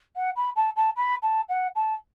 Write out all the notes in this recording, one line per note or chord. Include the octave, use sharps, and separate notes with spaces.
F#5
B5
A5
A5
B5
A5
F#5
A5